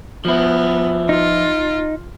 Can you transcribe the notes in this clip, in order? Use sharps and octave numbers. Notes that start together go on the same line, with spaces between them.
F3 B3 E4
D#4 F4